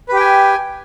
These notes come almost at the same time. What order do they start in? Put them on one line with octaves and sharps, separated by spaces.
B4 G4 G5 G#5